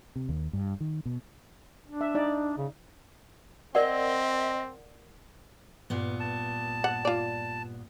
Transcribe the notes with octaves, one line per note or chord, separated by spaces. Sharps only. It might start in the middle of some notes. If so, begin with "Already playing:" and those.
C3
D#2
G2
D#3
B2
D4
E5
D#4 D5
C#3
C4 A#4 D5 D#5 F#5
G2 A#2 B3
A5
F#5
F4 D5